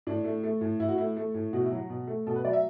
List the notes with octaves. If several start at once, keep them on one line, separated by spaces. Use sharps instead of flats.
A2 D4
A3
A3
A2
A2 E4
F#4
A3 E4
A3
A2
B2 F#4
E4
F#3 F#4
B2
A3
B2 A4
B4
F#3 D5
E5